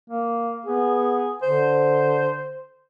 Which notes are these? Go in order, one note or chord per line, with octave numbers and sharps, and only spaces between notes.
A#3
B3 G#4
D3 C5